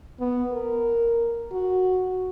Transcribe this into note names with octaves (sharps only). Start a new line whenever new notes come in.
B3
A#4
F#4